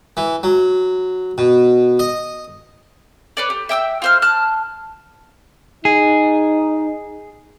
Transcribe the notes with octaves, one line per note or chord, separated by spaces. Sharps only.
E3
F#3
B2
D#5
B4 C#5 D5
G4
E5 G5 D#6 E6
F4 C5 F6
A5 F6 F#6
D#4 G#4